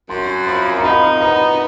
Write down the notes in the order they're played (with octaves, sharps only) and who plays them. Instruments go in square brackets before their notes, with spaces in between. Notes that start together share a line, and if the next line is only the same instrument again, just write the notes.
[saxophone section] F#2 [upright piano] C6
[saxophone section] F3 [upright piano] B5
[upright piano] A#5
[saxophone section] D#4 [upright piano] B5
[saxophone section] B3 [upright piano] A#5